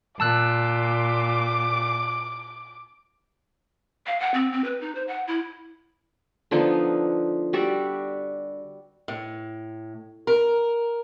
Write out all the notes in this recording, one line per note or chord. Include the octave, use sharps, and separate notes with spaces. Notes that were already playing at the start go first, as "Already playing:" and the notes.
A#2 A5 D6 E6 F#6
F5
F#5
C4
C4
B4
D#4
C5
F#5
E4
D3 F3 B3 D#4
G3 F#4 D5 E5
A2
A#4